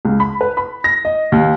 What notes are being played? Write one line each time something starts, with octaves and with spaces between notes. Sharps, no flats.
C#2
B5
B4
B5
A#6
D#5
D#2